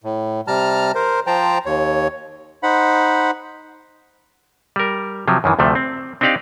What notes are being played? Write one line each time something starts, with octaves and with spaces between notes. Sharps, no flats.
A2
C3 G3 A5 A#5 F6
A#4 C5
F3 C5 G5 A5 A#5
D#2 C#5
D#4 C5 F#5 B5
G3 A#4
C3 F3 F#3
F#2 D#3 E3
D2 C3 F3 A3
C4
C4 D4 D#4 G4 D5 F5